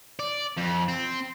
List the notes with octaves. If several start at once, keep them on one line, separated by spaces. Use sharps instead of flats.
D5
F2
C4